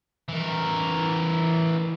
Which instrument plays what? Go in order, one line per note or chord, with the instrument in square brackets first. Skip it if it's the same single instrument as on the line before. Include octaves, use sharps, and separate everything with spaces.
[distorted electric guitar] E3 A#4